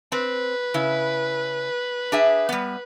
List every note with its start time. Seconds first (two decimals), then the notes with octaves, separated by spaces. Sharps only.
0.12 C4 B4
0.74 C#3 E4
2.12 D4 G#4 E5
2.49 G3 B3